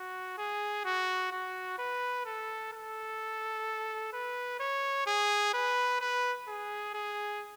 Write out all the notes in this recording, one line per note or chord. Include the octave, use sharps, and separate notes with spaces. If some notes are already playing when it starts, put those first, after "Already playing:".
Already playing: F#4
G#4
F#4
F#4
B4
A4
A4
B4
C#5
G#4
B4
B4
G#4
G#4